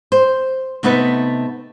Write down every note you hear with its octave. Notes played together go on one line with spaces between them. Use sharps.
C5
C3 A3 B3 D#4 B4